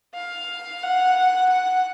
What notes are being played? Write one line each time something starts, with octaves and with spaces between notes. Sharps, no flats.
F5
F#5
F#5